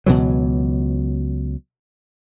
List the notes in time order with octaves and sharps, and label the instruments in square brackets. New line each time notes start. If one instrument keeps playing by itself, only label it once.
[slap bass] C#2 B2 E3 F#3